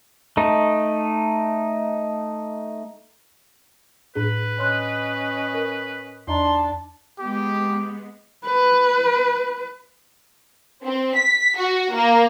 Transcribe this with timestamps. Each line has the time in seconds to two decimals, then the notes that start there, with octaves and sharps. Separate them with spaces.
0.37 A3 D#4
4.15 A2 D4 G#4 B4
4.59 C#4 C#5 D#5 C6 F#6
5.54 A#4
6.28 E2 D4 D#5 A5 A#5 C6
7.19 G#3 B3 G4
8.45 B4
10.84 C4
11.16 B6
11.57 F#4
11.93 A#3